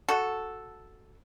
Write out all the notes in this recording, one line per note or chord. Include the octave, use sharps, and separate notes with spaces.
F#4 A4